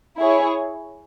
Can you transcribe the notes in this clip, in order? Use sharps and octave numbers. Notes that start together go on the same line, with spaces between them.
E4 G#4 C#5